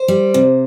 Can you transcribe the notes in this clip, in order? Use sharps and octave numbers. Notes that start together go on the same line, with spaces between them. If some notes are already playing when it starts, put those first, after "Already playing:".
Already playing: C5
G3
C3